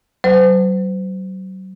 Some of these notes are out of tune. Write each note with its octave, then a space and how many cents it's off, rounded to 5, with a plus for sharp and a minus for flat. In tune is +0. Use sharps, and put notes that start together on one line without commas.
F#3 +35 C5 -40